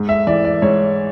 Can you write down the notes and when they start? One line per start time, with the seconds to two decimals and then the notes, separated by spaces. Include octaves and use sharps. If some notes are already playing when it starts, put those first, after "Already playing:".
Already playing: G#2
0.09 E5
0.27 E3 D5
0.45 D5
0.62 G#2 C#5